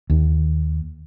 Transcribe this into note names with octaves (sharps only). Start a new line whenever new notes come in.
D#2